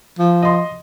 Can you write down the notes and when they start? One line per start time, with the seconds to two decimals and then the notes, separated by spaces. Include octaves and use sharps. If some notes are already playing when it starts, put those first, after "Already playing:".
0.19 F3
0.42 D#5 C6